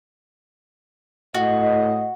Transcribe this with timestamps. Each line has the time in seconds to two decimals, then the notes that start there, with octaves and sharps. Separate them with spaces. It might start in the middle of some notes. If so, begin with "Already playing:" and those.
1.34 A2 F#4 D#5